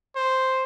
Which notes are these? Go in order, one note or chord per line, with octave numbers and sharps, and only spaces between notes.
C5